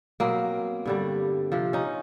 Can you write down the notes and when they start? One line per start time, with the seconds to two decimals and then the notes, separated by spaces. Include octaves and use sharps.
0.20 B2 F#3 A#3 C4
0.85 G2 D3 G3
1.52 C3 F3
1.73 C#4 D#4